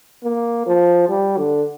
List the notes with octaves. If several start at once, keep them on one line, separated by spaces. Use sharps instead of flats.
A#3
F3
G3
D3